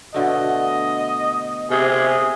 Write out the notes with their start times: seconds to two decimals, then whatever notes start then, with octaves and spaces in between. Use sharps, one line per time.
0.14 B2 D3 A3 D#5
1.70 C3 G#4